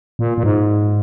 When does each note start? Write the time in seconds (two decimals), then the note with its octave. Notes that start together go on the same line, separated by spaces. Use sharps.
0.19 A#2
0.38 A#2
0.43 G#2